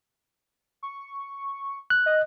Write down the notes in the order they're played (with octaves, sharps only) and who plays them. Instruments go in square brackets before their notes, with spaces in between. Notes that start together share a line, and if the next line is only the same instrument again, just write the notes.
[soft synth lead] C#6
[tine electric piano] F#6
[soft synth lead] D#5